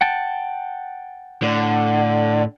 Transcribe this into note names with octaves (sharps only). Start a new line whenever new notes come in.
F#5 G5 A5
A2 D3